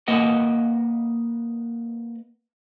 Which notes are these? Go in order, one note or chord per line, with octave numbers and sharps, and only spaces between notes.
A#3 B4 D#5 F#5